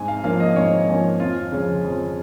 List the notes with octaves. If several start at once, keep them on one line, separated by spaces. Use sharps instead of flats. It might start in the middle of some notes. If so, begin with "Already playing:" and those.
Already playing: G#2 G#5
F5
F3 A#3 C#4 F5
D#5
G#2 C#5
F3 A#3 C#4
F2 F4
C#3 F3 G#3 C#4
F2